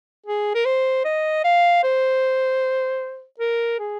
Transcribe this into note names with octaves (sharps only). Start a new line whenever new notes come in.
G#4
A#4
C5
D#5
F5
C5
A#4
G#4